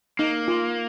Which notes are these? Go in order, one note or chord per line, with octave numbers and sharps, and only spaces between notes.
A#3 D#4
F4